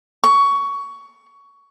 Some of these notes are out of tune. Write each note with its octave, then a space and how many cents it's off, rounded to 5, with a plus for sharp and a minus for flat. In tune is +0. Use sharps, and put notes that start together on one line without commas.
C#6 +15